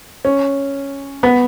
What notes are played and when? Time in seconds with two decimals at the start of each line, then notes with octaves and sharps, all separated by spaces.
0.25 C#4
1.23 B3